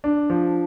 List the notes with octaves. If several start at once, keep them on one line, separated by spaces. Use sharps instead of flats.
D4
F3